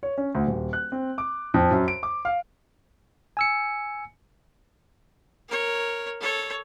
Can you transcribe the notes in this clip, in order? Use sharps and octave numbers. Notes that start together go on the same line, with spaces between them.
C#5
C#4
D2
D#1
F#6
C4
D6
F2
F#2
D7
D6
F5
G#5 E6 C#7
A#4 C#5
A4 C#5